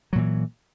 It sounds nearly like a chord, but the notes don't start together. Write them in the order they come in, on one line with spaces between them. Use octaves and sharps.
F#3 A#2 E3